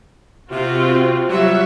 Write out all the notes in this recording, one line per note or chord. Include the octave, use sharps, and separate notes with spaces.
C3 C4 F4 F#4
F#3 G3 F4 F#4 E5